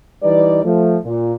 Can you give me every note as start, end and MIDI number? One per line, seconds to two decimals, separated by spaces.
0.23 0.60 52
0.23 0.60 55
0.23 0.60 63
0.23 0.60 71
0.23 0.60 74
0.64 0.97 53
0.64 0.97 57
1.04 1.32 46